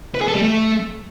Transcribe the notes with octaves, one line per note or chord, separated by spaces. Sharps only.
B4
G#4
A4
G3
A3